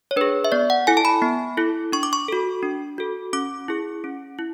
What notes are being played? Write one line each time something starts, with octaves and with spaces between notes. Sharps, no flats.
C#5
D4 G#4 B4
E5
B3 D5
F#5
E4 A4 G#5
A5
B5
B3
E4 A4
D4 C#6
D6
C#6
F#4 A4
D4
F#4 A4
C#4 D6
E4 G#4
C#4
E4